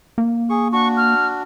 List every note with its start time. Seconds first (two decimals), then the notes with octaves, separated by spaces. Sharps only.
0.18 A#3
0.50 G#4 C#6
0.72 D4 F#4 C#6
0.97 F6